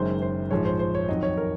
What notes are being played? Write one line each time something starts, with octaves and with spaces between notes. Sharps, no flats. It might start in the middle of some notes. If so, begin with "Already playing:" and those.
Already playing: F#1 F#2 D#3 G#3 C5
C5
A#1 G#2 F3 G#3 C#5
C5
C5
C#5
F2 D#3 F#3 D#5
C#5
A#4